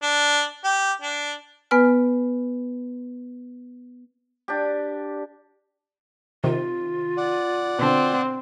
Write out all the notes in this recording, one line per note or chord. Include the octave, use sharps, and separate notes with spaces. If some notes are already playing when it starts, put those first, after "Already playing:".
D4
G4
D4
B3 B4 G#5 F6
D4 G4
C3 D#3 F4
D5 F#5
B2 D3 C4